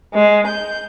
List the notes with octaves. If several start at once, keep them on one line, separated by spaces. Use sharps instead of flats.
G#3
G6